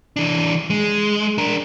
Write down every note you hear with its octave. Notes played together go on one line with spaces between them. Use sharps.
E3 D4
G#3
D4 A#4